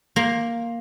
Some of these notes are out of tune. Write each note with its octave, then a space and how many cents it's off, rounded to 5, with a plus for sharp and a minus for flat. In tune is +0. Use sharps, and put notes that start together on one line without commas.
A#3 +0 C5 +25